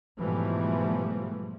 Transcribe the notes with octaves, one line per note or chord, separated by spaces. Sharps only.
G#2 B2 E3 F3 G3 A3